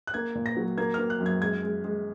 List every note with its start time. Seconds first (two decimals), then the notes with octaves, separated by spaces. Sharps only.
0.07 F#6
0.14 A#3 G#6
0.35 A#2
0.46 A#6
0.57 F#3
0.78 A#3 G#6
0.94 A#3 F6
1.10 F#6
1.20 F#2
1.26 G#6
1.41 G#3 G#6
1.63 G#3
1.84 G#3